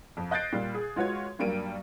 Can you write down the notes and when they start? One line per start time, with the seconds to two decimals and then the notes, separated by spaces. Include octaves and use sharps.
0.17 F2
0.31 D#5 F#6 G6 A6 C7 D7
0.52 A#2 G3
0.74 G#4
0.96 G#3 F4 F#4 B4 C#5 G#6
1.39 G2 F#3 G3 A#3 D7 D#7